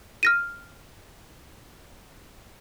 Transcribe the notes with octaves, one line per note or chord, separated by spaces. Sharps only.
F6 A#6 D#7